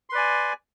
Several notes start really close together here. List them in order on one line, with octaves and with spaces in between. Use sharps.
C6 B4 D5 G#5